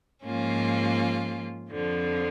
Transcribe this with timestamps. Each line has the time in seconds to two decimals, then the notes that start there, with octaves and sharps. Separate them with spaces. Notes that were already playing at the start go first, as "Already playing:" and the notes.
0.24 G#2 F3 A#3 C#4 F4
1.70 F2 D3 F3